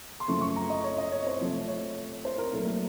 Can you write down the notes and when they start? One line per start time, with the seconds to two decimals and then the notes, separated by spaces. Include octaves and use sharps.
0.20 C6
0.28 F#2 C#3 F3 A3 C#6
0.41 C#6
0.56 A#5
0.70 D#5
0.84 C#5
0.98 D#5
1.12 C#5
1.27 C5
1.40 C3 F3 A3
1.68 C#5
2.25 C5
2.38 A#4
2.52 A#2 F#3 A3 A4
2.67 A#4